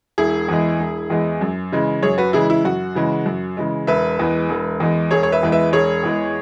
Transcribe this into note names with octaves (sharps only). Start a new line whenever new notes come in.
E1 E4 G#4
E2 E3 G#3
E1
E2 E3 G#3
F#2
C#3 E3 G#3
F#2 G#4 C#5
F#4 B4
C#3 E3 G#3 E4 G#4
E4
F#2 F#4
C#3 E3 G#3
F#2
C#3 E3 G#3
E1 B4 E5
E2 E3 G#3
E1
E2 E3 G#3
E1 G#4 C#5
C#5
B4 E5
E2 E3 G#3
B4 E5
E1 G#4 C#5
E2 E3 G#3